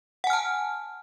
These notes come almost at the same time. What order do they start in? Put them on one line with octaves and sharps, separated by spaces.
F#5 G#5 F6 A5